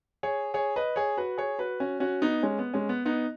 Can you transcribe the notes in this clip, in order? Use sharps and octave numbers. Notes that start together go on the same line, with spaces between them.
G#4 C#5
G#4 C#5
B4 D#5
G#4 C#5
F#4 B4
G#4 C#5
F#4 B4
C#4 F#4
C#4 F#4
B3 D#4
G#3 C#4
B3
G#3 C#4
B3
B3 D#4